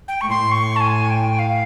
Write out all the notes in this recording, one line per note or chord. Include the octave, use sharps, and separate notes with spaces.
G5
A2 C#6
C6
C#6
A5
G#5
G5
F5